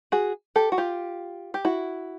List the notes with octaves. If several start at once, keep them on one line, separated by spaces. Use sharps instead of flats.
F#4 G#4
G4 A4
F#4
F4 G4
G4
E4 F#4